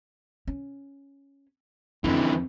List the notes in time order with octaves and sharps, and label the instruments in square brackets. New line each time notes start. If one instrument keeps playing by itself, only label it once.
[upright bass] C#4
[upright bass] F2 [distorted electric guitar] D3 E3